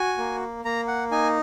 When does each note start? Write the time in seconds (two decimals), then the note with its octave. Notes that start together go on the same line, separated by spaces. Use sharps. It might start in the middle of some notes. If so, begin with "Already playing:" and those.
Already playing: F#4 G#5
0.18 A#3
0.65 A#3 A#5
0.88 F#5
1.11 D#4 G#5